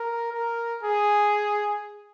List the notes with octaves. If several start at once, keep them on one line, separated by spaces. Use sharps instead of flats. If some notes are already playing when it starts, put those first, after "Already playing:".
Already playing: A#4
A#4
G#4